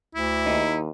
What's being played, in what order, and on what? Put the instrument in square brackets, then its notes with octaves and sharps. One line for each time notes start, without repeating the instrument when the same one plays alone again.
[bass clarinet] D2 [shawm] E4
[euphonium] D#2 [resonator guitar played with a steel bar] D#4